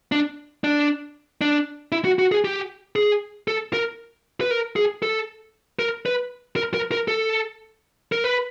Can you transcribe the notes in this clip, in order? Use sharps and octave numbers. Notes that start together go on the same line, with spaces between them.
D4
D4
D4
E4
F#4
F#4
G#4
G4
G#4
A4
A#4
B4
A#4
G#4
A4
A#4
B4
A#4
A#4
A#4
A4
A#4
B4